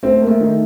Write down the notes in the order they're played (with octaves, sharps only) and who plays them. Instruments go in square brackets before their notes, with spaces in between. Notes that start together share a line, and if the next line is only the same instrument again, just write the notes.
[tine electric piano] A3 [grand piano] C4
[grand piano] A#3
[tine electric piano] A3
[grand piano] D#3